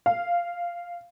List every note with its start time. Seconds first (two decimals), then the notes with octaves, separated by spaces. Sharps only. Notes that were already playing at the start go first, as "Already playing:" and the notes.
0.06 F5